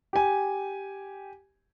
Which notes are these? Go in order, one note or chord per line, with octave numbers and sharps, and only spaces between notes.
G4 G#5